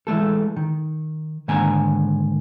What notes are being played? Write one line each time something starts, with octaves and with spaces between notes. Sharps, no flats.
E3 G#3 A3 A4
D#3
G#2 D3 D#3 A#3 G#5 A#5